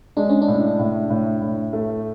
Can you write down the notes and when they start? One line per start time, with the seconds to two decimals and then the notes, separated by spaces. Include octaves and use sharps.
0.17 G#3 D4
0.29 C#4
0.42 D4
0.48 A2
0.79 A2
1.11 A2
1.42 A2
1.73 A3